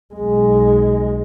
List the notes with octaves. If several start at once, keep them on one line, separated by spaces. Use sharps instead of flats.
B1 G#3